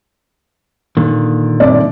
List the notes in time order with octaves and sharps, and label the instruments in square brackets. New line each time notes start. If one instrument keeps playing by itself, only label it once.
[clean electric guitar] A#2 D3 D#3
[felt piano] C2 C3 D5